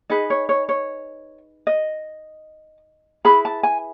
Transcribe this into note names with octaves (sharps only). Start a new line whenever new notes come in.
D#4 G#4 B4 D#5
C#5
C#5
C#5
D#5
E4 G#4 B4 B5
A5
G#5